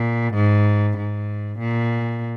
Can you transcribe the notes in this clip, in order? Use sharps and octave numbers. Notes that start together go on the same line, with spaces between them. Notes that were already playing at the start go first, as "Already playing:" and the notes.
Already playing: A#2
G#2
G#2
A#2